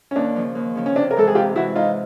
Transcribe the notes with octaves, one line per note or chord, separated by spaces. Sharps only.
C#4
D#2 D4
C#3 F3
D#2
C#3 F3
C#4
C3 D4
A#4
E3 G#3 A4
G#4
C3 F4 G4
E3 G#3 E4 F#4
G#2 D#4 F4